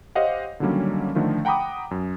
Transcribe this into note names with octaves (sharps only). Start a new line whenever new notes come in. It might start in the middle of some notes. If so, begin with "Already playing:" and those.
G4 C5 C#5 D#5 F5 F#5
D3 D#3 F#3 G3 A#3 C#4
D3 D#3 F3 A3
F#5 G5 A#5 B5 D6 D#6
F#2